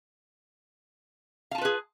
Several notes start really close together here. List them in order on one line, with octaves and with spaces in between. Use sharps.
F5 A5 F4 B4 G#4